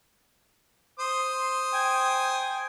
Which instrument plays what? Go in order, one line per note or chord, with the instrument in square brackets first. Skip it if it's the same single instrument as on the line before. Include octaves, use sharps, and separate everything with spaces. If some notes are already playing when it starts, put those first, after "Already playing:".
[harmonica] C5 D#6 [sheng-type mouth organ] C6
[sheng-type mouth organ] G5 G#5